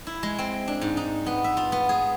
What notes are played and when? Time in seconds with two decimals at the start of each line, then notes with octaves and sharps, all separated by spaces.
0.07 E4
0.23 G#3
0.38 C4
0.68 D4
0.81 G#2
0.97 D#4
1.26 B3
1.44 E5
1.57 F4
1.72 B3
1.89 G#4